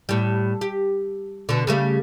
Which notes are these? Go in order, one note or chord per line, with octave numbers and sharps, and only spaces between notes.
A2 G3
G4
B2 D3
C#3 G3 A3